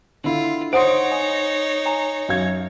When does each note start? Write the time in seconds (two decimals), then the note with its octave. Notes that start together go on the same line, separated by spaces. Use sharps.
0.24 D3 E4 F4
0.73 D#4 C5 C#5 F#5 C6 D#6 D7
1.12 G#5
1.86 G#5 A#5
2.29 F#2 F5 G#6